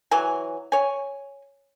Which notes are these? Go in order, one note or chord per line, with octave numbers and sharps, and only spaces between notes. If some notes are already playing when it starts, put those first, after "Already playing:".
E3 F#3 G#5
C#5 G#5